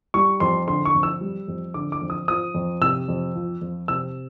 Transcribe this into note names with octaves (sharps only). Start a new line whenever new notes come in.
G3 C#6
F2 C6
D3 C6
C#6
F2
E6
G3
F2
D3 D6
D6
F2
D#6
F3 D#6
F2
C3 E6
F2
F3
F2
C3 E6